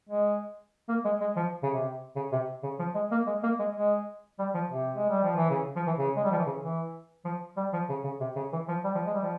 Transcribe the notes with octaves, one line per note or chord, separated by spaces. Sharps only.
G#3
A#3
G#3
G#3
F3
C#3
C3
C#3
C3
C#3
F3
G#3
A#3
G#3
A#3
G#3
G#3
G3
F3
C3
G#3
G3
F3
E3
C#3
F3
E3
C#3
G#3
G3
F3
E3
C#3
E3
F3
G3
F3
C#3
C#3
C3
C#3
E3
F3
G3
F3
G#3
G3
F3